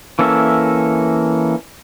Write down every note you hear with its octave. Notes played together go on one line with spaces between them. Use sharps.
E3 A#3 C#4 A4 E5